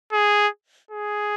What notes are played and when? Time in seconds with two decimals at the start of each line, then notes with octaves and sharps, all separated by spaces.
0.12 G#4
0.91 G#4